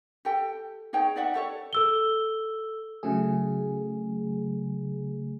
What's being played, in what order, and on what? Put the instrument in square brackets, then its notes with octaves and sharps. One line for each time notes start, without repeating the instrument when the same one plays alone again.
[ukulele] G4 A4 G5
D#4 G#4 C#5 G5
D#4 D5 E5 F#5
G4 A4 C#5
[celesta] A4 E6 G7
[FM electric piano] C#3 F#3 A3 G#4